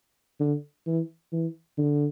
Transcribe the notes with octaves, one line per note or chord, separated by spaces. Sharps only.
D3
E3
E3
D3